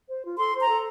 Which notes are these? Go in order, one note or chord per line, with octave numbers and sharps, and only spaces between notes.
C5
F4
A4 C6
C5
A#5
A4